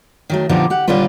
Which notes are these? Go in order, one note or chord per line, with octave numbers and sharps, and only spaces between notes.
D#3 F#3 A3
A#2 D3 F3 B3 D#4 G4
G4 F#5
D#2 A#2 D3 G3 F4 B4